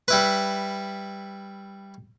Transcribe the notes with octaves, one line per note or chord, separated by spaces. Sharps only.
G3 E4 B4